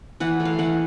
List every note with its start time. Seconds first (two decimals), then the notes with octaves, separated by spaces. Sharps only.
0.20 E3 F#5
0.40 A3
0.45 F5
0.59 E3 F#5